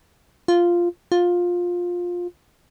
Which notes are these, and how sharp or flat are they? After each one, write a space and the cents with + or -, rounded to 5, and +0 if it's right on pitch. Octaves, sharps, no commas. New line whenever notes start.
F4 -5
F4 +15